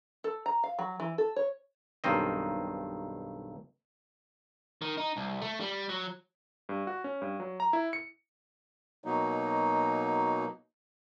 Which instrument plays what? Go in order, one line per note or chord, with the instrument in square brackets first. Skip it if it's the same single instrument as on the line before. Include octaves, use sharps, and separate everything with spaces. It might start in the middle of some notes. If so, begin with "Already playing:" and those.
[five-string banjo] A4
A#5
F5
F#3
E3
A4
C#5
[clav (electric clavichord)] B1 G2 D#3 C4 D#5
[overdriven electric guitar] D#3
D#4
C2
A3
G3
F#3
[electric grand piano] G2
F#4
C#4
G2
F#3
A#5
E4
C#7
[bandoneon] B2 F#3 A#3 D#4